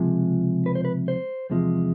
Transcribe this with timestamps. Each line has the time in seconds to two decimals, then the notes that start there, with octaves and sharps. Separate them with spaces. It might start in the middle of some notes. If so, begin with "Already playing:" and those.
Already playing: C#2 C3 F3 G#3
0.66 B4
0.75 C5
0.85 B4
1.08 C5
1.50 E2 C3 F3 G#3